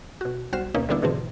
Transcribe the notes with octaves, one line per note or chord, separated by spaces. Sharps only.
B2 F#4
B1 G3 F#4 C5 F6 E7
D2 B2 A#3 C#4 D#4
D3 G3 A#3 B3 D4 E4
G#2 B2 D3 E3 A3 C4